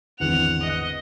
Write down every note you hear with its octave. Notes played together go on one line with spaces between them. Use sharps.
G#1 E2 D3 F#5 F7
D#5